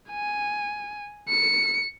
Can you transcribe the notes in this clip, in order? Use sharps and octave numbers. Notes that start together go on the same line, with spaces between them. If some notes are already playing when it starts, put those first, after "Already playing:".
G#5
C#7